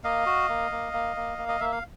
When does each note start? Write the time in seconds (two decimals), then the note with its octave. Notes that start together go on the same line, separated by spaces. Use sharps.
0.04 A#3 D#5 F5
0.26 F#4
0.49 A#3
0.71 A#3
0.93 A#3
1.16 A#3
1.38 A#3
1.49 D#5
1.60 A#3 E5
1.72 F5